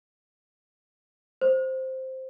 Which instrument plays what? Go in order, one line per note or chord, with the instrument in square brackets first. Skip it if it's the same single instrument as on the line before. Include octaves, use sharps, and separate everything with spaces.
[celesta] C5